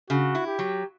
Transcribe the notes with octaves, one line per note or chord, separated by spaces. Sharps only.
C#3 F#4
E4
G4
F#3